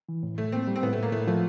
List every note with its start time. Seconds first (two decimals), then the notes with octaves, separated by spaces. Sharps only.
0.09 E3
0.23 A2
0.38 A2 A3
0.52 A#3 C4
0.67 G3
0.76 C4
0.83 A2 B3
0.93 A3
0.98 A2 A#3
1.12 A2 A3
1.27 F3 A3